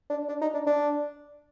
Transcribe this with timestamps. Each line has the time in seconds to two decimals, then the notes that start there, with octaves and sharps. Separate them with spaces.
0.10 D4
0.29 D4
0.42 D#4
0.54 D4
0.67 D4